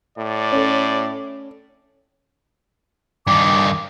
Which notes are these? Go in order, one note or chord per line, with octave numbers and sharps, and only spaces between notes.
A2 D5
C#4 A4
G2 D#3 D6